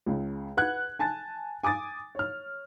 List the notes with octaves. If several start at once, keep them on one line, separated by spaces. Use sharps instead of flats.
C#2 C#3
B4 F#5 F#6 G#6
G#5 A5 A6
G#5 D6 D#6 A6
C#5 F6